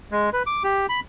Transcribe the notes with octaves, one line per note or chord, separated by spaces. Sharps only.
G#3
B4
D6
G4
B5